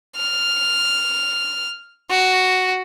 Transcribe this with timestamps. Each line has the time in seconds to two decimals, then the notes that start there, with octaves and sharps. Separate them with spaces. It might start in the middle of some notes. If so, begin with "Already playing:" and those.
0.17 F6
2.10 F#4